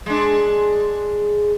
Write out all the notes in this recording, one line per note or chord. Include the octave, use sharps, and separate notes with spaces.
G#3 D4